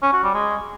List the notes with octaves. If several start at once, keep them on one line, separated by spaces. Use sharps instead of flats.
C#4
F#4
G3
G#3